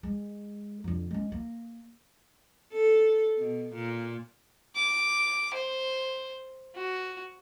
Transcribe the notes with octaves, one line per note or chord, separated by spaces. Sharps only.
G#3
F2 D3
G#3 C#4
A#3
A4
B2
A#2
D6
C5
F#4